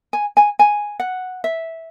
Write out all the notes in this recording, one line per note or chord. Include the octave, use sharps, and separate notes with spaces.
G#5
G#5
G#5
F#5
E5